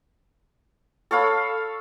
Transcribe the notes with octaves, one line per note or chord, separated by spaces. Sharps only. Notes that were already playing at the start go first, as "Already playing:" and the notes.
A4 C#5 F5 B5